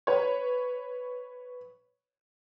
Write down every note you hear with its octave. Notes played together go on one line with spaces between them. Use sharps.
B4 C#5